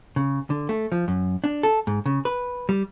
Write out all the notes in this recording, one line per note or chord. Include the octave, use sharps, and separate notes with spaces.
C#3
D3
A3
F3
F#2
D4
A4
G#2
C#3
B4
G3